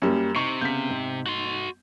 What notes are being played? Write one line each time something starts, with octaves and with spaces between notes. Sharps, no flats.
F#2 G3 A#3 C#4
C3 D#4 C#6
C#3 B3 G6 B6
G#2
F#4 C6